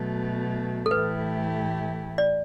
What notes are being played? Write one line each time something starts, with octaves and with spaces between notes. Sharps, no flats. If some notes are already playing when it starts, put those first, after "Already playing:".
Already playing: B2 F#3 A3
A4
A2 E3 A3 E4 G4 B4
D5